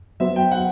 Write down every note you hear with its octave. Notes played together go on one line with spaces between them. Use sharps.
F#3 B3 F#4 C5 E5
G5
F#5